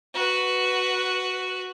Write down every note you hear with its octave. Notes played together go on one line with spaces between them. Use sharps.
F#4 B4